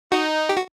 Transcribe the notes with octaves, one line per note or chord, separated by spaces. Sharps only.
D#4 F#4
G4
F#4